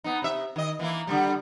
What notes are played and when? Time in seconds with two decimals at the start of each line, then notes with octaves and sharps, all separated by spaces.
0.04 B3 D#4
0.22 C3 E5
0.56 D#3 D#5
0.79 E3 A#3 E4
1.07 D3 F3 G3